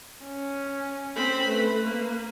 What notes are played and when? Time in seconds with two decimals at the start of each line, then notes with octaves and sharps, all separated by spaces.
0.25 C#4
1.16 C4 B5
1.47 A3 B4
1.84 A#3